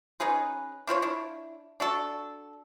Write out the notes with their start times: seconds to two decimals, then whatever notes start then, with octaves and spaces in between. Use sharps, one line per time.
0.20 C#4 D#4 G#4 B4
0.87 D4 F4 C5 C#5
1.02 D4 E4
1.80 D4 F#4 A4